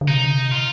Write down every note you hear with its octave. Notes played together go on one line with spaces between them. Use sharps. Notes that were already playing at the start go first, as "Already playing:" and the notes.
D3
C3 D#4
D3
C3
A#2 F4